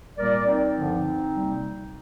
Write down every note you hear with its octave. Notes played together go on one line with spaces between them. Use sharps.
A#2 G3 A#3 A#4 D5
C4 D#4
G2 D3 F3
C3 G3 A#3